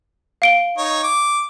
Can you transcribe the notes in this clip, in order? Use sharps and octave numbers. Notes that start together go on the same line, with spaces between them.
F5 D7 G7
D#4 C#5
D6